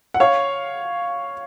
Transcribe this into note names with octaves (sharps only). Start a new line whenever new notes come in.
F#5
C#5 F5